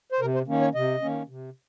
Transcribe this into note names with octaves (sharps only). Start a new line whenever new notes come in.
C5
C3 A#4
C5
D#3 A#3 C#4
C#5
C3 D#5
D#3 A#3 C#4
C3